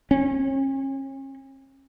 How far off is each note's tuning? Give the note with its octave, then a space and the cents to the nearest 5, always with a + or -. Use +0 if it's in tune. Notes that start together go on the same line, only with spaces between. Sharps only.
C#4 -40